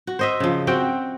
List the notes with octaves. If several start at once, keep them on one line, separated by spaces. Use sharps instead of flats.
F#4
C5 D#5 E5
C#3 F3
C4 F#4 G5